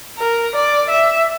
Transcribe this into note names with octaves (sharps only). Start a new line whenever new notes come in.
A#4
D5
E5